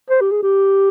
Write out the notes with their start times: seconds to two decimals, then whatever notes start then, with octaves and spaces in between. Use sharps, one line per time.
0.10 C5
0.21 G4
0.31 G#4
0.42 G4